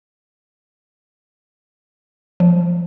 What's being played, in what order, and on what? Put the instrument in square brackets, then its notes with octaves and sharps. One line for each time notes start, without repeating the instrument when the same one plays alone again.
[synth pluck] F3